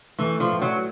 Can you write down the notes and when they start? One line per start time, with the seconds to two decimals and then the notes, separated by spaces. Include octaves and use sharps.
0.19 E3 A3
0.40 F3
0.51 A2
0.62 F#3